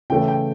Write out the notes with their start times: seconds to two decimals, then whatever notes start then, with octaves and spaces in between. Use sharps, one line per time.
0.10 C#3 E3 A3 G5
0.28 G5